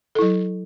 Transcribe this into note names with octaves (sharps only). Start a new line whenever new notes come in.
F#3 E4 A4